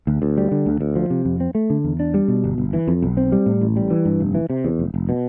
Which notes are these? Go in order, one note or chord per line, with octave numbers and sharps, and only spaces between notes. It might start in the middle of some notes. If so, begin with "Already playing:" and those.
D2
D2
G3
D3
D2
D2
F3
C3
F2
C4
A3
D3
E2
D4
G3
B2
G1
G1
E3
F2
B1
C4
G3
A2
A1
G3
E3
G2
F1
E3
C3
E2
F1
F1
B2